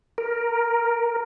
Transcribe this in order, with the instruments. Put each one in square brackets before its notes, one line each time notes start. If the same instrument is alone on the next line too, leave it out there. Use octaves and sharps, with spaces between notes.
[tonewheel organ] A#4